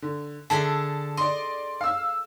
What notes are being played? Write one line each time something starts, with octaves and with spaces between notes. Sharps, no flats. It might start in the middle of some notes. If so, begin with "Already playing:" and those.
D3
D3 G#4 E5 A5
D5 D#5 C6
F5 E6